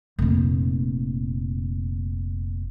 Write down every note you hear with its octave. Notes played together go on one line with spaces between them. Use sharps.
F1 A#2